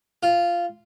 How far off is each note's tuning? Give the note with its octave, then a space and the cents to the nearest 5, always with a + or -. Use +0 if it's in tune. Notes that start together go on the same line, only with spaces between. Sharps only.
F4 -10